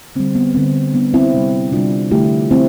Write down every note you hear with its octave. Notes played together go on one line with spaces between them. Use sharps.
D3 G3 C4
B3
D3 G3 C4
D3 G3 B3 D4
C4 E4
C3 G3
C3 G3 D4 F4
D3 F3 A3 E4 G4
F3 A3 C4 E4